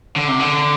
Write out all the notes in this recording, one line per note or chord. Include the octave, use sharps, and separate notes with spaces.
D3
C3
D3